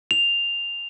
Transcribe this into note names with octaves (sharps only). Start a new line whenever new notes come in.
F7